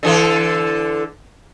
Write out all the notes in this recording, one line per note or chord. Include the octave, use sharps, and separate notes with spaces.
D3 E3 A4